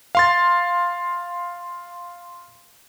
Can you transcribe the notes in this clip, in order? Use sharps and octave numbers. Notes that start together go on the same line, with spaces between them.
F5 C6 A6